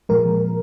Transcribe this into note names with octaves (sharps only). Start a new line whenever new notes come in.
A#2 F3 G#3 A#4